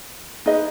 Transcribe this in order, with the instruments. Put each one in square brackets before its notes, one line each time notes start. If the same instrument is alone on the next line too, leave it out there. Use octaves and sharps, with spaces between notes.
[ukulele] D#4 G#4 B4 D#5